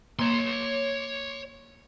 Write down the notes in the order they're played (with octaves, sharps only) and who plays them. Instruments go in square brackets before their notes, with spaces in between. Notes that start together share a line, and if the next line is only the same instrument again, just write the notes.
[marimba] A#3 [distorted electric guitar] C#5 C6